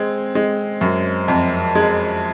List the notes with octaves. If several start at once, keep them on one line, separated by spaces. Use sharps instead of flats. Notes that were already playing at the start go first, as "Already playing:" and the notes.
Already playing: G#3 C4
G#3
F#2
F2
G#3